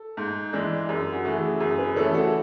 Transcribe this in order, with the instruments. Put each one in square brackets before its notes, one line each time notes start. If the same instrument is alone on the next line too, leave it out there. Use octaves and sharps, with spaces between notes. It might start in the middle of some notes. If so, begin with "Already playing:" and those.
Already playing: [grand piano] A4
[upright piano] G#2
E3 G#3 D4
[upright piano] F#2 [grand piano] G#4
[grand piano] F#4
[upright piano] C#3 E3 A3
[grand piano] G#4
[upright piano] F#2 [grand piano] G#4
[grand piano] G#4 B4
[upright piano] C#3 E3 A3 [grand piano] A4 C#5
[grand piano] F#4 A4